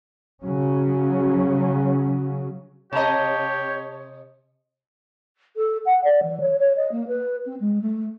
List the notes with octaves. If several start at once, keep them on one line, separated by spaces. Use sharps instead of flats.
C#3 F#3 C#4
C3 G4 C#5 D#5 A5 A#5
A4
F#5
D5
E3
C#5
C#5
D#5
A#3
B4
C4
G#3
A3